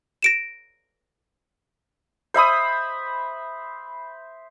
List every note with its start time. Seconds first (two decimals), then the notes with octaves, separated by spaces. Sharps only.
0.22 A#6 D7 E7
2.34 C5 E5 B5 D#6